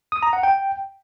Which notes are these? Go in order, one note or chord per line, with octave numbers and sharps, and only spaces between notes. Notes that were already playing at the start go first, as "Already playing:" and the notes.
D#6
A#5
F#5
G5